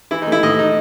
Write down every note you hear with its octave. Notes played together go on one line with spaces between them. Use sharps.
E3 E4
D#4
A3 E4
A2 D#5
D#4